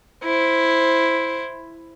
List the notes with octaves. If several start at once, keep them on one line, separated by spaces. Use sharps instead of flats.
E4 C5